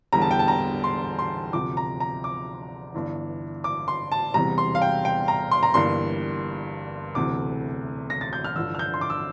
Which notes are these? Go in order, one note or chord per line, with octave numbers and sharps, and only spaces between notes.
E1 E2 D3 G3 A#5
A5
G5
A5
A#5
C6
C6
D2 C3 F3 D6
A#5
A#5
D6
G1 G2 E3
D6
C6
A5
E1 E2 C3 G3 A#5
C6
F5
G5
G5
A#5
C6
A#5
G1 G2 E3 G3 A#3 C6
E1 D2 C3 E3 A3 D6
A#6
A6
G6
F6
A1 G2 D3 F3 E6
F6
G6
C6
D6
E6